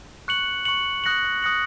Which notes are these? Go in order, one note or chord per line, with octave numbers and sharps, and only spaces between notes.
C#6 F#6 C#7 F#7
C#6 F#6 C#7 F#7
D#6 F#6 A#6 C#7 F#7
D#6 F#6 A#6 C#7 F#7